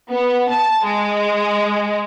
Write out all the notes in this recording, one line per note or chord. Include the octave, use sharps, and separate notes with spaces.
B3
A5
G#3